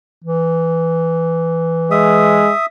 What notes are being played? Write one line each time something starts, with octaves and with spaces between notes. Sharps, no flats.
E3
G#3 E5 D#6